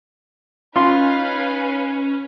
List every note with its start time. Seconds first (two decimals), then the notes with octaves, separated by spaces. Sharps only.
0.76 C#4 D#4 F4 B4 F5 C6